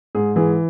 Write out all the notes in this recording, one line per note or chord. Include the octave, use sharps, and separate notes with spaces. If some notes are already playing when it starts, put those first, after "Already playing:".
G#2 G#4
E3 G#4